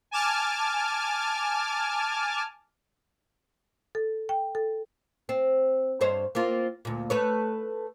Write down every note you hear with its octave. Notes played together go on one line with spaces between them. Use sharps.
G#5 A5 D6 F6
A4
G5
A4
C4
G2 C5 C#5
A#3 C4 F4
D2 A#2
A3 B4 C#5